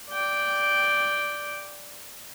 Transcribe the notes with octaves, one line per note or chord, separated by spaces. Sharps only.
D5 G5